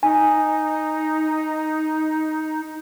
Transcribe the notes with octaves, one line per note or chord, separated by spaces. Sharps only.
D#4 G#5